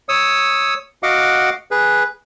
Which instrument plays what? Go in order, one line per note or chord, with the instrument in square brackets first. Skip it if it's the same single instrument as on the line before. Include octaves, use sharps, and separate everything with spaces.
[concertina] C#5 D#6 E6
F#4 D#5 F5 F#5 D6
G#4 B4